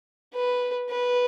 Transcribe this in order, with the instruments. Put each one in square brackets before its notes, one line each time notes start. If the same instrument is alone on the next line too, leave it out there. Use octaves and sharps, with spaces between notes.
[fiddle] B4
B4